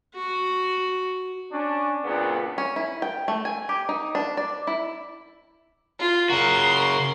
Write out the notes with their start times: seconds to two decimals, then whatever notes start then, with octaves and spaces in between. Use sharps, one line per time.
0.14 F#4
1.52 C#4 D4
2.04 F#2 A#2 C#3 B3 C4 D4
2.58 C#4
2.76 E4
3.02 G5
3.28 A3
3.45 G#5
3.69 G4
3.89 D#4
4.15 D4
4.37 D5
4.67 E4
5.99 F4
6.30 C#3 F#4 A#4 C6